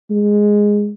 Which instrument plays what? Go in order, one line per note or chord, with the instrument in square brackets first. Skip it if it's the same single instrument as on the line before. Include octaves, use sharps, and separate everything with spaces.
[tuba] G#3